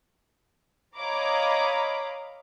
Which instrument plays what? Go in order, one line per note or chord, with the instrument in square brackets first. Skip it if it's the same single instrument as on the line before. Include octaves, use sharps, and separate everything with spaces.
[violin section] C#5 D#5 F5 A#5 B5 D6